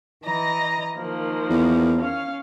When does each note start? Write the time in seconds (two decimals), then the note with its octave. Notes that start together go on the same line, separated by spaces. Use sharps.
0.24 E3 D#5 A#5
0.96 D#3 F3 A#3
1.50 E2
1.99 C#4 F5